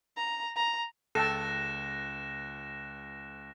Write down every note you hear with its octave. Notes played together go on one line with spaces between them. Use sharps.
A#5
A#5
C#2 A4 G5 A5 F#6 A#6 E7